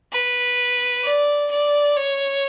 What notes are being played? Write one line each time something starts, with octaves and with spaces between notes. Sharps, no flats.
B4
D5
D5
C#5